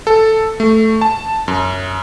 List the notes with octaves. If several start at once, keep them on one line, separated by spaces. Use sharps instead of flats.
A4
A3
A5
F#2